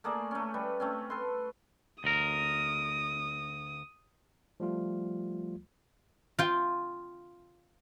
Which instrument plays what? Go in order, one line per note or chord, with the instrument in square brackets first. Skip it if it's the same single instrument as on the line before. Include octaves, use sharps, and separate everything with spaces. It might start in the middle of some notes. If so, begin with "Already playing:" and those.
[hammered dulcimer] A3 A#3 G#4 D5
A3 C#4
G3 B4
A3 C4 C#4
A4 B4 C6
[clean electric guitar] D2 A#4 [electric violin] D#6
[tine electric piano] F3 G3 A3 F4
[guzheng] F4 G5